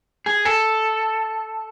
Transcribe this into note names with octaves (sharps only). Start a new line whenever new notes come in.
G#4
A4